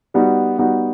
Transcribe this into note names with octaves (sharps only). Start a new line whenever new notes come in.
G3 B3 D#4 F#4
G3 B3 D#4 F#4